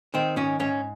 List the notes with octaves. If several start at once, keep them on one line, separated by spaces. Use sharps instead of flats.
D#3 C4
G#2 C#4
G#2 C#4